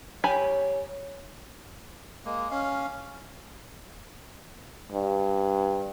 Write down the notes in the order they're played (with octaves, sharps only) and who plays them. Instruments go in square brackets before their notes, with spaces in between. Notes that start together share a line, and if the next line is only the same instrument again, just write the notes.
[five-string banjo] G4 G#5 B5 [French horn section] C#5
[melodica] G#3 A#3
C#4 F5
[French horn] G2